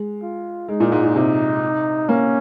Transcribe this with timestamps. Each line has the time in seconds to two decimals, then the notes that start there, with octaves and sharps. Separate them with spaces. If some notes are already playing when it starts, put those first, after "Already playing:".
Already playing: G#3
0.23 F4
0.68 G#3 D#4
0.80 A#2
0.92 G#2
1.04 A#2
1.15 C3 D#4
2.09 A#3 C#4